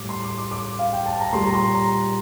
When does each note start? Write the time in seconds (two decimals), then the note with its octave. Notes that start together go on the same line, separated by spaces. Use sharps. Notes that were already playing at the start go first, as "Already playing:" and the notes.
Already playing: A2 G3 D6
0.09 C6
0.24 D6
0.38 D6
0.51 D6
0.79 F5
0.92 G5
1.06 A5
1.20 A#5
1.32 A#2 G3 C6
1.45 A#5
1.54 C6
1.74 A#5